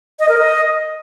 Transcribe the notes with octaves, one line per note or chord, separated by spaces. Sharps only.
D#5
A#4
D#5